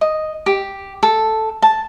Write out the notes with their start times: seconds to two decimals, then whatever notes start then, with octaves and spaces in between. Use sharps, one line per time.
0.01 D#5
0.46 G4
1.03 A4
1.62 A5